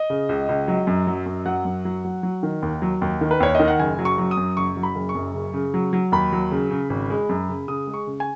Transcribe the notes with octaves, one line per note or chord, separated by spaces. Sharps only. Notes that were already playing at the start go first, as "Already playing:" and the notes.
Already playing: D#5
C#3
C#2
C#2
F#3
F#2
F#3
F#2
F#3 F#5
F#2
F#3
F#3
F#3
D#3
D#2
F#3
D#2
D#3
B4
D#2 C#5
D#3 D#5
F#5
F#1 G#5
F#3
C#6
F#3
D#6
F#2
F#1 C#6
F#3
B5
F#1
C#6
F#2
C#3
C#3
F#3
F#3
D#2 B5
F#3
C#3
C#3
G#1
G#3
F#2
C#3
C#3 D#6
G#3
C#6
C#3
G#5